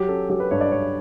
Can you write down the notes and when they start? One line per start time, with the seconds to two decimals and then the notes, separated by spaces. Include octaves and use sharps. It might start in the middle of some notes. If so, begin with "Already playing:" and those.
Already playing: F#3 G4
0.08 C#4 A4
0.29 F#3 G4
0.40 B4
0.51 G2 C#5
0.61 D5
0.71 G2 C#5